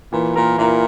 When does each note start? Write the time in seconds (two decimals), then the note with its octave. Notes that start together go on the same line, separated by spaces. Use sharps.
0.13 A#2 E3
0.36 A#2 A#4
0.58 A#2 E4